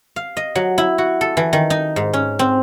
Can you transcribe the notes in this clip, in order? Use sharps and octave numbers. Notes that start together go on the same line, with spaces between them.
F5
D#5
F#3
E4
F#4
A4
E3
D#3
D#4
G#2
C#4
C4